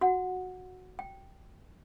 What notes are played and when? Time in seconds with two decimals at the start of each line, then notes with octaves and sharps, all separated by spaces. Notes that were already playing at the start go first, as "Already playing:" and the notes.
0.01 F#4 F#5
0.99 G5